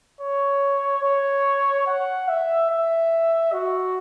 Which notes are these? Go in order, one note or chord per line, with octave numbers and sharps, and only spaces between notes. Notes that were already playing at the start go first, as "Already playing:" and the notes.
C#5
C#5
F#5
E5
E5
F#4